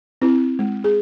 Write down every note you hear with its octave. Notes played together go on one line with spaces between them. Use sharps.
C4 E4
G#3
G#4